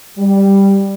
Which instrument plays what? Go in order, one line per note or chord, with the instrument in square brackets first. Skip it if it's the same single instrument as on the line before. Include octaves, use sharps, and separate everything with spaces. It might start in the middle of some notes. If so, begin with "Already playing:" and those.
[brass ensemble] G3